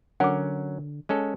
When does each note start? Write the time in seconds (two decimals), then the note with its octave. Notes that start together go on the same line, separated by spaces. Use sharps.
0.20 D3 F#3 C#4 A#4 F#5 D6
1.09 G#3 C#4 A4